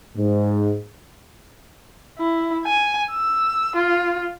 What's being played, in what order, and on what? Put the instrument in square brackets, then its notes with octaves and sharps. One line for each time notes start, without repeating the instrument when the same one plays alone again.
[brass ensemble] G#2
[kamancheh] E4
G#5
E6
F4